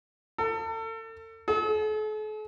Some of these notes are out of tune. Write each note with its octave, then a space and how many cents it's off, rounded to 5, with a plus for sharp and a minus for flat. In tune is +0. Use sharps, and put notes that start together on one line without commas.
A4 +35
A4 -45